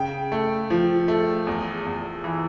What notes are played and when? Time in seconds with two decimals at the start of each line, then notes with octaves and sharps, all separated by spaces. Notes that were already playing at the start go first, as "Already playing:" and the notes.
Already playing: C#3 G5
0.32 A3
0.70 F3
1.08 A3
1.47 E2
1.86 E2
2.24 E3